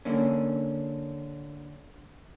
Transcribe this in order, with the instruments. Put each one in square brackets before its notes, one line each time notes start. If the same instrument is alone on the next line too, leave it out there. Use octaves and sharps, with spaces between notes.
[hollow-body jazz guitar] D3 A#3 C#4